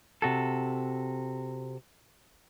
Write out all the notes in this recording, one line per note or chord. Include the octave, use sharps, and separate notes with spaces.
C3 F#4 A4